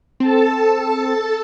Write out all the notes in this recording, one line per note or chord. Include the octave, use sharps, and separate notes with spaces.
C4 A4 A5